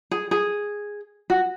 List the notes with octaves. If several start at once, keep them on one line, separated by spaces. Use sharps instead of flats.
G#4
G#4
F#4